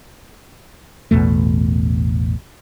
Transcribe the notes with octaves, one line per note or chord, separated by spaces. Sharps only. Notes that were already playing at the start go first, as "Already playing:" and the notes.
A1 E2 B2 A3